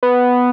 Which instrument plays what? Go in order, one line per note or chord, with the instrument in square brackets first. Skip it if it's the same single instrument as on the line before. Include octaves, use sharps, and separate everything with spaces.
[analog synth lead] B3